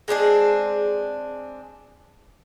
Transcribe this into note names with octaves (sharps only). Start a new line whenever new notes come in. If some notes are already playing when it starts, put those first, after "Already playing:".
G#3 C4 D4 G#4